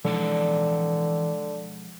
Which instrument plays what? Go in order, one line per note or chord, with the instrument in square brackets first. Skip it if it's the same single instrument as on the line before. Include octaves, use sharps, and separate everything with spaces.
[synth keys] B2 F3 G#3 [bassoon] D3 [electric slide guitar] E3 A4 D5